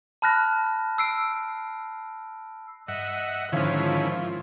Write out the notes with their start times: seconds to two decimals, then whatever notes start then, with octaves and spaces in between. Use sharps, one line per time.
0.22 A5 B5 F6 F#6 A#6
0.98 E6 C7 D7
2.88 G2 D#5 E5 F#5
3.52 G#2 D3 D#3 F3 C#4 E4 F4